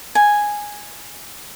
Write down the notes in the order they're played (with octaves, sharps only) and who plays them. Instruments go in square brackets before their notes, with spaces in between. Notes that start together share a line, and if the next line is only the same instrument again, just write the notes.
[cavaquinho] G#5